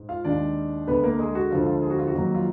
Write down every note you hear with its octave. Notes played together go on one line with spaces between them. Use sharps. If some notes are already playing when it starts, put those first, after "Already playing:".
Already playing: G#2
F4 F5
D#2 D#3 G#3 D4 D5
D2 D3 G#3 B3 B4
A#3 A#4
G#3 G#4
F#4
D2 D3 F3 G#3 F4
F4
G#4
F#4
F4
F#4
F2 D#3 F#3 A#3
F4